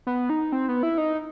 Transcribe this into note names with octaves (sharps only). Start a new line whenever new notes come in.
B3
D#4
C4
B3
E4
D#4